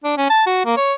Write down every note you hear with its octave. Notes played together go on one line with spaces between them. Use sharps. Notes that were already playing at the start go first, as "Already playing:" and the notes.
D4
C#4
A5
F#4
A#3
C#5